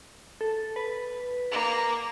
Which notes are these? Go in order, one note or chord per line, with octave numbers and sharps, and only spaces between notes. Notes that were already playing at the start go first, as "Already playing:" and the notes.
A4
B4
A#3